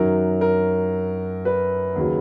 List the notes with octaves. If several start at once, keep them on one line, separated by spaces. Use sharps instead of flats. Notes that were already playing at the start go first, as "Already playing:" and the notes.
Already playing: F#2 D#3 F#3 A#4
A#4
B4
D#2 C#3 F#3